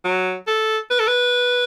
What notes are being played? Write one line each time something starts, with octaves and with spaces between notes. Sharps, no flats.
F#3
A4
B4
A4
B4